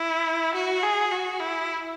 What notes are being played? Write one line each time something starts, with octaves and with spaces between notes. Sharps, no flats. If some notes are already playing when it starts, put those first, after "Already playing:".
Already playing: E4
F#4
G#4
F#4
E4